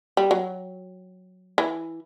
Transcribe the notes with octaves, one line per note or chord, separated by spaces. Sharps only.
G3
F#3
E3